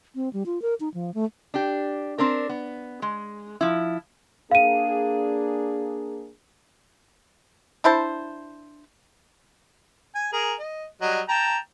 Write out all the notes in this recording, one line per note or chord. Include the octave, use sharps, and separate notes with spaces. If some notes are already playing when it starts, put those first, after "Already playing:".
C4
G3
F4
A#4
D#4
F3
A3
D4 G4
C4 D4 A#4
B3
G#3
F3 E4
A#3 D4 G#4 F5 D#7
D4 E4 C5 A5
G#5
G#4 A#4
D#5
F#3 G3 D#5
G5 A5 A#5